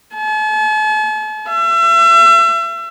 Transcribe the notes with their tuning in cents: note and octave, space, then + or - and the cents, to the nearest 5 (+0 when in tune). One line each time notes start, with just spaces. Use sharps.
A5 -45
E5 +35